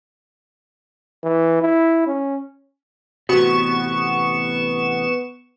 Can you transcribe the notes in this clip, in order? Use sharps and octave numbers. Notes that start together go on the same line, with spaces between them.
E3
E4
C#4
A1 C3 B3 F#4 C#6 E7